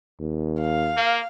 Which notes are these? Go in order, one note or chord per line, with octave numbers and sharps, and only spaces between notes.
D#2
F5
A#3